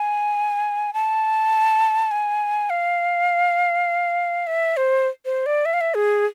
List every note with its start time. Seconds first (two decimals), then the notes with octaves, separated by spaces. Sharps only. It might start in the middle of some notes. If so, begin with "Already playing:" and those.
Already playing: G#5
0.94 A5
2.11 G#5
2.70 F5
4.47 E5
4.77 C5
5.25 C5
5.46 D5
5.65 E5
5.74 F5
5.81 E5
5.95 G#4